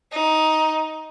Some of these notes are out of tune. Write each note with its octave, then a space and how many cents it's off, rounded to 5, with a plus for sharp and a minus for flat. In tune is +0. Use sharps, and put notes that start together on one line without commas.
D#4 +10